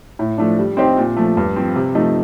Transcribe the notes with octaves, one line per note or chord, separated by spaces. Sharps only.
A2
F3 A3 D4
G3
C4 D#4 G4 C5
A#2
F3 A3
G2
F3 C4
C3
F3 A3 D#4